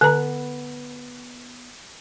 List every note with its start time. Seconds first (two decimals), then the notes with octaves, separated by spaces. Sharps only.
0.01 D3 B3 A#5